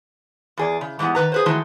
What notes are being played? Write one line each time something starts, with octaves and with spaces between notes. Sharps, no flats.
E2 G#4 D5
C#3
G#2 E3 G3 B3
D#3 G3 B4 A#5
G#4 B4 C5
D#3 E3 F#3 G#3 A3